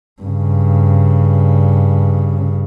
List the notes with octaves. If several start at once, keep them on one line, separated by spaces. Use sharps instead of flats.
G2 C#3